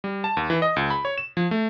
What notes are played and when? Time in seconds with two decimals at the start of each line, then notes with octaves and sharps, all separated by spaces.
0.04 G3
0.24 A5
0.37 D#2
0.50 E3
0.62 D#5
0.76 C#2
0.90 B5
1.05 C#5
1.18 E7
1.37 F3
1.51 A3